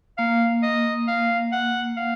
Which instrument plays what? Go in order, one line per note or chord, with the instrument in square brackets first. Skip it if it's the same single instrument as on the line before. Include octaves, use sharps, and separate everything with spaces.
[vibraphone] A#3 [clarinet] F5
[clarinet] D#5
F5
F#5
F5